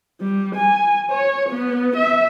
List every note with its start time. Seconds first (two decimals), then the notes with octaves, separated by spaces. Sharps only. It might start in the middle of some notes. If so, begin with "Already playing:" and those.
0.21 G3
0.56 G#5
1.12 C#5
1.50 B3
1.97 E5